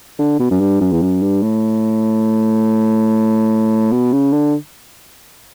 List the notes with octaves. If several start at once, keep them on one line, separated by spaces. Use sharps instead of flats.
D3
B2
F#2
G2
F#2
E2
F#2
G2
A2
B2
C#3
D3